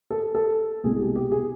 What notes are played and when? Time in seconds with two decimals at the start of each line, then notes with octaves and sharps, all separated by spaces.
0.10 A4
0.35 A4
0.84 C2 B2 G#3 G#4
1.00 G4
1.16 G4
1.32 G#4